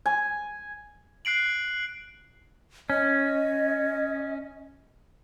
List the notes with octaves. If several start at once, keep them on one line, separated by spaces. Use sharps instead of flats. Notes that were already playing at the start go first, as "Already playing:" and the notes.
G#5
F#6 C7 D7 F#7
C#4 D#5